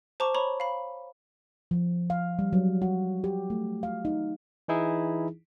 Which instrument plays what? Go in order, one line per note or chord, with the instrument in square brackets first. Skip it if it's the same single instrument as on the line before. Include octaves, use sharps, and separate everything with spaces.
[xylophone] C5 A5 A#5 C#6 D6
C#5 A#5 B5 C#6
F5 B5
[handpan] F3
F5
G3
F#3
F#4
G4
A3
F5
D#4
[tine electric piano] E3 D#4 E4 G#4